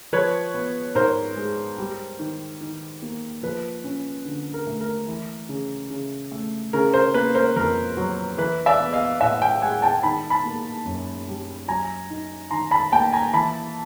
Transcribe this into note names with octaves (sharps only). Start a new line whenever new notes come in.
F3 B4 C#5
B3
G#2 A#4 C5
G#3
G3
D#3
D#3
A#3
F3 B4
C#4
D3
A#4
A3
A#4
E3
C#3
C#3
A3
C#3 A#4
A#4 C5
A#3 B4
A#4 C5
F2 A#4
F#3
E3 B4
D5 E5
B3
D#5 F5
A2 E5 F#5
F5 G5
G#3 F#5 G#5
G5 A5
D#3 A5 B5
A5 B5
A#3
F#2
G3
F#3 G#5 A#5
D#4
D#3 A#5 C6
A5 B5
A#3 G5 A5
G#5 A#5
E3 A5 B5